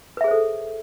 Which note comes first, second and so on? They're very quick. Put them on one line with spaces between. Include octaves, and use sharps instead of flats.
B4 E5 G#4 C5 A4